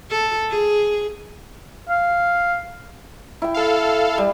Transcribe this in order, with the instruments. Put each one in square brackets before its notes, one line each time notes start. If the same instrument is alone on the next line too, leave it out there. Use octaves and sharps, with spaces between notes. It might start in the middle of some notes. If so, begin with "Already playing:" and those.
[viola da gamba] A4
G#4
[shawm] F5
[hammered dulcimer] E4 G5
[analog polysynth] A4 F5
[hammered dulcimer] G3